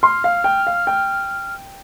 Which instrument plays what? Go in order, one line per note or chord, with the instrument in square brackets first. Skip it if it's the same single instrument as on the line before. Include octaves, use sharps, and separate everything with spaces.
[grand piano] C6 [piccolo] F6
[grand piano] F5
G5
F5
G5